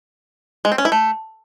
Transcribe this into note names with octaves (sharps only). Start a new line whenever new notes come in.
G#3
C4
C#4
E4
A3